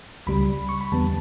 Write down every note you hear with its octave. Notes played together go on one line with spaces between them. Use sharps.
C#2 C#3 G3 B5
C#6
B5
E2 D3 G3 B3 A5